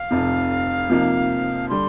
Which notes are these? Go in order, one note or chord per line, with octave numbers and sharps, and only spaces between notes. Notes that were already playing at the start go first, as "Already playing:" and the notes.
Already playing: F5
F1 F2 C3
C3 F3 A#3 D#4
D3 G3 C6